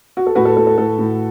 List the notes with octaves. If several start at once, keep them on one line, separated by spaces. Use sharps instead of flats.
F#4
A4
A2 F#4 B4
A4
A2 A4
A4
A2 A4
A2